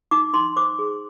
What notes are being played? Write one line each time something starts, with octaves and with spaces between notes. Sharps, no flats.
D#4 D6
D#4 C6
C5 D6
G#4